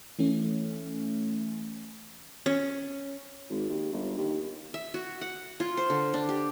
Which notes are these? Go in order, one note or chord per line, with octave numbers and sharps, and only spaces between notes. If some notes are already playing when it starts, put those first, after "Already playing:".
E3 A3 C#4
C#4
G#1
D#2
G1
D#2
E5
F#4
F#5
F4
C5
D3
D4
G4